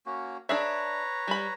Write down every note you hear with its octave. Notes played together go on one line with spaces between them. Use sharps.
A#3 C#4 F#4
D4 G#4 B4 C#5 E5 A#5
G3 B5